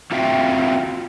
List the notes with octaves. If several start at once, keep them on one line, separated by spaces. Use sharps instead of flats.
C4 F4 F#4 E5 F5 G5